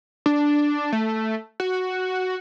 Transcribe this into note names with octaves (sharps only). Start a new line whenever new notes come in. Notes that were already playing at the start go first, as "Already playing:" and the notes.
D4
A3
F#4